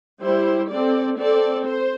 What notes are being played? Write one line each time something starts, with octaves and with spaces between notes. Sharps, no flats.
G3 E4 G4 C5
C4 A4 D5
C4 A4 D5
C5